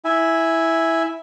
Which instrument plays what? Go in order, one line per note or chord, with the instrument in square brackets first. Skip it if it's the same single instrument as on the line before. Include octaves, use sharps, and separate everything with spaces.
[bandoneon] E4 E5 G#5